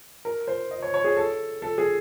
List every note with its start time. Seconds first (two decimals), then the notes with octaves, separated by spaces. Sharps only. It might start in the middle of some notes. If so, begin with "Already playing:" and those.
0.25 A#4
0.48 C5
0.71 D#5
0.82 C#5
0.94 C#5
1.04 G#4
1.17 A4
1.62 A4
1.78 G#4